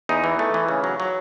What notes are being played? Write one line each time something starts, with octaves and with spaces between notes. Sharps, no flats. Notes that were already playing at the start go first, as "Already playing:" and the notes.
E2 D#4
E3
A3
E3
C#3
F#3
F#3